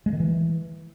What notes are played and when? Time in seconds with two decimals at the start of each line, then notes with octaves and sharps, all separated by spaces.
0.06 G#3
0.13 D#3
0.20 E3